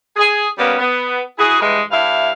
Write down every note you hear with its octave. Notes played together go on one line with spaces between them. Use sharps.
G#4
G3 A#3 B3 C#4
B3
E4 F#4 G#4
G2 E3 G#3
G2 E4 E5 F5